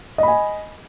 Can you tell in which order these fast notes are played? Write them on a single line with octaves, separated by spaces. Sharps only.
D#5 B5 G#5